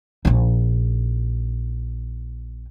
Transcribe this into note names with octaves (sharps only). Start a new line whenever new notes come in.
A#1 D#4